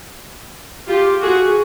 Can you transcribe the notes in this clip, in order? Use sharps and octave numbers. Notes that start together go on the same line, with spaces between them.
F4 G4
F#4 G#4